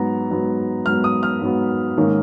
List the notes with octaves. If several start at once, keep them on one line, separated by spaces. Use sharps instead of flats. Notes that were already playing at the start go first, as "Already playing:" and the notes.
Already playing: G#2 F#3 B3 A#5
G#2 F#3 B3
G#2 F#3 B3 F6
D#6
F6
G#2 F#3 B3
G#2 D#3 A#3 C#4